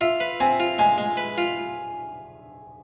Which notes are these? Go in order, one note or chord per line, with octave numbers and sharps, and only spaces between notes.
F4 E5
B4
C4 G#5
F4
G#3 G#5
G#3
B4
F4